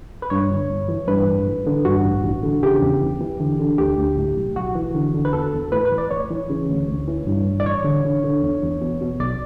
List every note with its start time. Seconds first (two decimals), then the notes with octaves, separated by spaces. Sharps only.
0.22 B4
0.30 G2 C#5
0.50 G1
0.70 G1
0.88 E3
1.08 G2 B4
1.27 A1
1.47 A1
1.67 D3
1.85 G2 F#4
2.05 A1
2.24 A1
2.43 D3
2.63 C#3 G4
2.81 E2
3.01 E2
3.21 E3
3.40 D3
3.59 D3
3.78 D2 G4
3.98 D2
4.18 A2
4.37 B1
4.56 B1 F#4
4.75 E3
4.95 D3
5.14 D3
5.25 B4
5.33 E2 A4
5.53 E2
5.72 A2 B4
5.85 B4
5.92 A1
5.98 D5
6.11 A1 C#5
6.30 E3
6.49 C#3
6.69 D2
6.88 D2
7.08 E3
7.27 G2
7.46 A1
7.60 D5
7.66 A1 C#5
7.84 D3
8.05 D3
8.24 D3
8.43 E2
8.62 E2
8.81 B2
9.01 B2
9.20 B1 D5